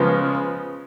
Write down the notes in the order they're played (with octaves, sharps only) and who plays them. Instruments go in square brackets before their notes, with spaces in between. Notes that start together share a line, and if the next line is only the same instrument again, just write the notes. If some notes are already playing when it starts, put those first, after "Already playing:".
Already playing: [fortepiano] C#3 F3 G#3 B3